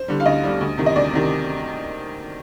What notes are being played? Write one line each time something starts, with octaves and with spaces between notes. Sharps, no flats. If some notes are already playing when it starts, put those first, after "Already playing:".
Already playing: C5
D3 G3
F5
D2 D#5
D3 G3
D2
C3 D#3
D#5
D2 D5
C3 D#3